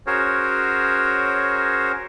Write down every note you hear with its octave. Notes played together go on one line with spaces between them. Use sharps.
C#4 F#4 G#4 A#4 C5 C#5